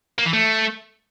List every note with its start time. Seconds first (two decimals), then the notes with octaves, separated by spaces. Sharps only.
0.19 A#3
0.26 E3
0.33 A3